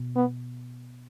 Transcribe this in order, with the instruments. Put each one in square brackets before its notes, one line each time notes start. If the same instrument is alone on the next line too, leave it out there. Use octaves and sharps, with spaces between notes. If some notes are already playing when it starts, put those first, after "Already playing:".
Already playing: [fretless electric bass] B2
[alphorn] B3